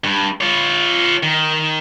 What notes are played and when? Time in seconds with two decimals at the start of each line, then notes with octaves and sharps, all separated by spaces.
0.04 G2
0.41 F4 C#5
1.23 D#3